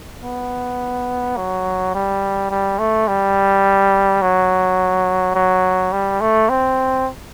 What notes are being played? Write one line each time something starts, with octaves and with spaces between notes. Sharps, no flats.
B3
F#3
G3
G3
A3
G3
F#3
F#3
G3
A3
C4